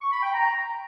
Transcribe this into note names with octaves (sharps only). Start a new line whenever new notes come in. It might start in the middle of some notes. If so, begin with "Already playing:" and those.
C#6
B5
G5
A#5